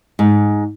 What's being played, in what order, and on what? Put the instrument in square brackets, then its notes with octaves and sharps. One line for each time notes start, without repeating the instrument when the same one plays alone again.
[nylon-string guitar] G#2